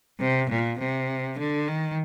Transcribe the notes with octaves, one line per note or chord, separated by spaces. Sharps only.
C3
A#2
C3
D3
D#3